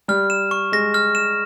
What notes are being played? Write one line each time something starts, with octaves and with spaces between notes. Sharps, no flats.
G3 F6
E7
C#6
G#3 A#6
F6
E7